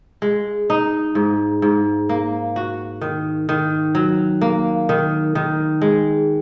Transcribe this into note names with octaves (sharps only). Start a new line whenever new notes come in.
G#3
D#4
G#2
G#2
A#3
F#4
D#3
D#3
F#3
A#3
D#3
D#3
G#3